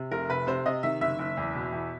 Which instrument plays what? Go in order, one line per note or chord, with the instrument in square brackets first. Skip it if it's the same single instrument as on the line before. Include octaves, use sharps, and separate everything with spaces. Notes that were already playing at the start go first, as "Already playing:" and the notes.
Already playing: [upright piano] C3
F1 A#4
C3 B4
C3 C5
C3 D#5
D#3 E5
F#1 E5
F#1
E2
B2
E2